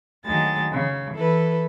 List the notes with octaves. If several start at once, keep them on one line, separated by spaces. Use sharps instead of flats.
D2 D#3 F#3 G#3 A6
C#3
E3 E4 A4 B4